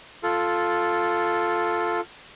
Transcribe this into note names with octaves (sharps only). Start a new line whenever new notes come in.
F4 A4